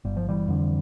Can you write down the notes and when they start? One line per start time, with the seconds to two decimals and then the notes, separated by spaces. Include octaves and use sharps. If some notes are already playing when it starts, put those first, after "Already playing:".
0.05 G1 G3
0.17 F3
0.29 E3 G3
0.47 F2 D3